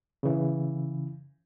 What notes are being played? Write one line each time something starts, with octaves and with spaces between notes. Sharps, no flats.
C#3 E3